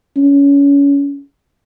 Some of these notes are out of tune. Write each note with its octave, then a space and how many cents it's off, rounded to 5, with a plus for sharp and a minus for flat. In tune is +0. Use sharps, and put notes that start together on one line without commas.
C#4 +25